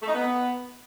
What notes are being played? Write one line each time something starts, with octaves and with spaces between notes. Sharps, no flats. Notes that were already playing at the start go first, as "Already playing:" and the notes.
A3
D#4
B3